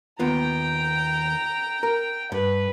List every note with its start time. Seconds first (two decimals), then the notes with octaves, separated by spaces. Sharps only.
0.19 D#2 B3 F4 G5 A#5
1.83 A#4
2.32 G2 B4